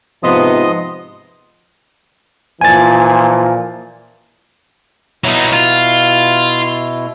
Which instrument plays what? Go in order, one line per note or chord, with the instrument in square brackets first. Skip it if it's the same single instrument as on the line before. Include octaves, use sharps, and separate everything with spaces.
[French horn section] G#2 C3 F3 [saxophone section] B3 [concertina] D#5 C6 D#6
[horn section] A#2 E3 F3 [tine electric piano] G#5 A6
[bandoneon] B2 E4 [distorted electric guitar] F#3 D#4
[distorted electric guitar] F4